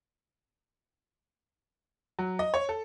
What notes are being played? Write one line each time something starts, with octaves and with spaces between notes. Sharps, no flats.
F#3
D#5
C#5
A4